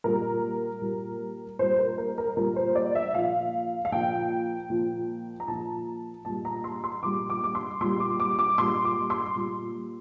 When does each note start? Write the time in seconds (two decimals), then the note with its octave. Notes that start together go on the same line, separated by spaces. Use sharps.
0.04 A#2 G3 A#4
0.82 A#2 G3
1.59 A#2 G3 C5
1.78 A#4
1.98 A#4
2.18 A#4
2.37 A#2 G3 A#4
2.56 C5
2.75 D5
2.95 E5
3.14 A#2 F3 F5
3.85 F5
3.92 A#2 F3 G5
4.70 A#2 F3
5.40 A#5
5.48 A#2 F3 A5
6.25 A#2 G3 A5
6.45 A#5
6.64 C6
6.84 C6
7.03 A#2 G3 D6
7.30 D6
7.44 D6
7.55 C6
7.81 A#2 G3 C6
8.00 D6
8.20 D6
8.39 D6
8.58 A#2 G3 C6
8.85 D6
9.10 C6
9.36 A#2 G3